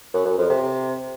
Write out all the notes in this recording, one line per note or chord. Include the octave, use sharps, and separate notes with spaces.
F#2
F#2
F2
C3